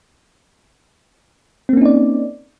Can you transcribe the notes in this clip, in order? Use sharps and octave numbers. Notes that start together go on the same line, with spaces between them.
A#3 C4 C#4 D#4 D5